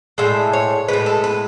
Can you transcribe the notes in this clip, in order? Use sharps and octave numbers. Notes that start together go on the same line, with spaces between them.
A2 G#3 E5
C#5
A2 G#3 B4
A4
B4